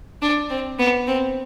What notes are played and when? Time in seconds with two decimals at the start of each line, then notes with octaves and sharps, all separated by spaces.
0.22 D4
0.50 C4
0.79 B3
1.07 C4